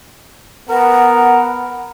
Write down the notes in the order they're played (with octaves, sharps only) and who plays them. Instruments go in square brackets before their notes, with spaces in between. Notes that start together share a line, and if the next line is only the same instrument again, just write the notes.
[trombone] B3 [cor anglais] A#4 [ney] F#5